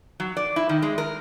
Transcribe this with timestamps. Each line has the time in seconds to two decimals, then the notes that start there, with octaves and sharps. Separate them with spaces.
0.20 F#3
0.37 D5
0.56 E4
0.69 D#3
0.82 G#3
0.98 A#4